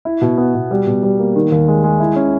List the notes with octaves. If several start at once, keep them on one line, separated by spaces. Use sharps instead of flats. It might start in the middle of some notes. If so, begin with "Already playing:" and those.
E4
B2
B3
B2
G3
B2
G3
A#3
D#3
D#2
G#3
G#3
E4
C#4